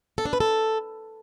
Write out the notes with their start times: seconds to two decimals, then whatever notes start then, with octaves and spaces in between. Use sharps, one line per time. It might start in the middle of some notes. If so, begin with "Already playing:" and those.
0.18 A4
0.25 D4
0.33 B4
0.40 A4